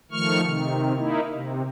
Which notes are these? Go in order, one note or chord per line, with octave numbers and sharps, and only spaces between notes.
D#3 F3 A3 C#6 F6
C3 D#3
A#3 D#4 E4
C3